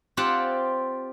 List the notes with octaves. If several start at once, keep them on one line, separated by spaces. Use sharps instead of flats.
C4 F4 G4 D5 F#5 A5